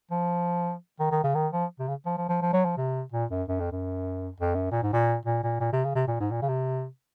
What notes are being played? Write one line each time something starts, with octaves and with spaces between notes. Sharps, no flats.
F3
D#3
D#3
C#3
D#3
F3
C3
C#3
F3
F3
F3
F3
F#3
F3
C3
A#2
F#2
F#2
F2
F#2
F2
F#2
A#2
G#2
A#2
A#2
A#2
A#2
C3
C#3
C3
A#2
G#2
A#2
C#3
C3